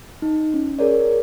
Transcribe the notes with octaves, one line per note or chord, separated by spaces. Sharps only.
D#4
C#4
G#4 A#4 C#5 D5